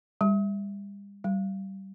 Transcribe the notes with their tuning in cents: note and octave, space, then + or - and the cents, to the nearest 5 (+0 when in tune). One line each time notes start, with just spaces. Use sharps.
G3 +35
G3 -20